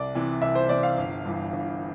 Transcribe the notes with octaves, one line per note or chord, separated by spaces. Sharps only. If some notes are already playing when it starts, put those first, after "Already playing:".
Already playing: C2 D5
C3 E3
C2 E5
C5
C3 E3 D5
F5
G1
G2 E3
G1